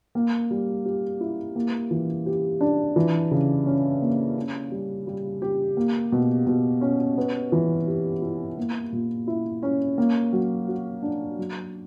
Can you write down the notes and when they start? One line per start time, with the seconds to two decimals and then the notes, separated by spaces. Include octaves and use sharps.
0.15 A#3
0.51 G3
0.85 G4
1.21 E4
1.56 A#3
1.91 E3
2.26 G4
2.61 D4
2.96 E3
3.31 C#3
3.66 C#4
4.01 A#3
4.36 C#4
4.72 G3
5.07 G3
5.42 G4
5.77 A#3
6.12 B2
6.47 B2
6.81 C#4
7.18 B3
7.52 E3
7.87 G4
8.22 E4
8.58 A#3
8.92 A#2
9.27 E4
9.63 C#4
9.98 A#3
10.33 F#3
10.68 F#4
11.02 D4
11.38 F#3